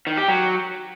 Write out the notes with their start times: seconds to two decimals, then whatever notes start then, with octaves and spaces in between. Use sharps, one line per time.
0.07 D#3
0.17 G4
0.28 F#3